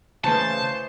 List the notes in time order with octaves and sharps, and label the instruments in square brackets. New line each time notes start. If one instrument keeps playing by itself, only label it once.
[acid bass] C#3 [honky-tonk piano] E3 A3 B3 [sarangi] C5 [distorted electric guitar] A5